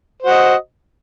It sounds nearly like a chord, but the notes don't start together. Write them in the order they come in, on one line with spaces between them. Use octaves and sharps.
C5 F#4 D#5